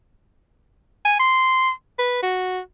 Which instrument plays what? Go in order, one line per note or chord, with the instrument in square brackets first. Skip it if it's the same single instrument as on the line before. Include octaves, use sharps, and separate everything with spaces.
[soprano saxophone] G#5
C6
B4
F#4